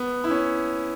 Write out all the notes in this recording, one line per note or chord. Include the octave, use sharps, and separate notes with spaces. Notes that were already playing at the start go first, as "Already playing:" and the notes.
Already playing: B3
E4
C#4